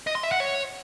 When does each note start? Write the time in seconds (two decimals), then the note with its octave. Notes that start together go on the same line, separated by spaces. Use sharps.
0.07 D#5
0.15 C6
0.23 E5
0.32 F#5
0.40 C#5